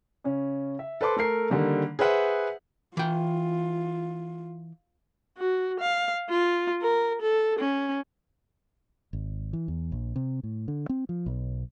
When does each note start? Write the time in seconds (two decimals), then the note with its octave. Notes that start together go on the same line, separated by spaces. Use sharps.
0.24 C#3 C#4
0.79 E5
1.01 A4 B4 C5 A5 C6 D6
1.16 A3 A4 A#4 C7
1.50 D3 D#3 G3 A#3 D4
1.99 G#4 B4 C5 E5 F#5
2.97 E3 F4 G5
5.38 F#4
5.80 F5
6.30 F4
6.82 A#4
7.22 A4
7.59 C#4
9.13 G#1
9.53 E3
9.68 E2
9.92 A#1
10.16 C3
10.43 A2
10.68 D3
10.89 C4
11.09 F3
11.26 B1